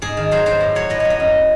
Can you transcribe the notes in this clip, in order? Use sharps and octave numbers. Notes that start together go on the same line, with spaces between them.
G#2 G#4
D#3
F#3 C5
G#2 C5
A2
F#3 C#5
A2 D#5
F#3 C#5
D#5
F#2